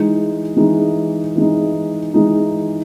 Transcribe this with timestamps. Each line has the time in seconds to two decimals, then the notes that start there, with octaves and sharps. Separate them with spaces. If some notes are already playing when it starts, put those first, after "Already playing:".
Already playing: E3 G#3 D#4
0.57 E3 G#3 D#4
1.35 E3 G#3 D#4
2.14 E3 G#3 D#4